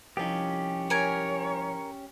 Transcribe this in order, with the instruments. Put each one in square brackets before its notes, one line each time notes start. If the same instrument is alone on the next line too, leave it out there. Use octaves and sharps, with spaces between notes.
[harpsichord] C2 F3 D#4 [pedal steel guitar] C#4 G4
[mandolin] A#4 G#5 [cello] C#5